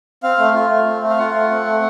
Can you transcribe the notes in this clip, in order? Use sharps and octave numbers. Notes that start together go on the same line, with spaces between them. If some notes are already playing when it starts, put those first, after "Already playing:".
C4 F5
A3
F4
A3
C4
A3
F5
F4 F#5
A3
C4
A3